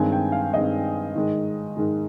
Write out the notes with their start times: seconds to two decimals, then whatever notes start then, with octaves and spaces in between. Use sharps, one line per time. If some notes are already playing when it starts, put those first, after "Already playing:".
Already playing: G2 D#3 G#3 C4 G#5
0.12 G5
0.32 F5
0.53 G2 D#3 G#3 C4 D#5
1.15 G#2 D#3 G#3
1.77 G#2 D#3 G#3